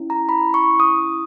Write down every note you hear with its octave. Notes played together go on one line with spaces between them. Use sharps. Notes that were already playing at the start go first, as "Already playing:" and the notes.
Already playing: C#4 E4
A#5
B5
C#6
D#6